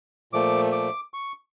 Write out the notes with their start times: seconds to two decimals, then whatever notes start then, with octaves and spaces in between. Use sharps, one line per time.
0.33 A#2 F3 A3 D6
0.72 D6
1.14 C#6